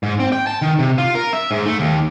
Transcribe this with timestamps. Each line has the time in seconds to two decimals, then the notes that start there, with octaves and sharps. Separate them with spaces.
0.03 G#2
0.20 C4
0.32 G5
0.47 A5
0.62 D#3
0.79 C3
0.98 F4
1.15 A#4
1.33 E5
1.51 G#2
1.66 A3
1.80 D#2